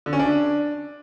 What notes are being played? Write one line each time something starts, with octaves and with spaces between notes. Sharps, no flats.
D3
C#4
D4